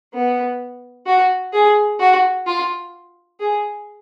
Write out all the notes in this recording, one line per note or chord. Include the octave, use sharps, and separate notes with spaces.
B3
F#4
G#4
F#4
F4
G#4